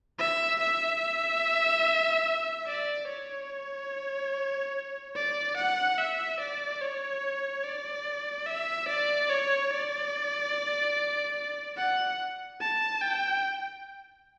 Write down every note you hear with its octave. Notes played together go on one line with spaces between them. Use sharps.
E5
E5
D5
C#5
D5
F#5
E5
D5
C#5
D5
E5
D5
C#5
D5
F#5
A5
G5